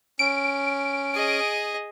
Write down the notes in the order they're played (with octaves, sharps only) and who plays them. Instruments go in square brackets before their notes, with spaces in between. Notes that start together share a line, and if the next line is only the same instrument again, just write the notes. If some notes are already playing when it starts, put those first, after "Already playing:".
[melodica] C#4 [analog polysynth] D7
[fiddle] G#4 D#5